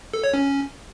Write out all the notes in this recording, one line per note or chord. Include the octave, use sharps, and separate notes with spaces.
A4
C#5
C#4